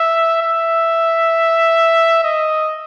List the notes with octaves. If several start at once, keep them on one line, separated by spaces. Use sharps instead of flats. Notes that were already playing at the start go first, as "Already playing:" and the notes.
Already playing: E5
E5
D#5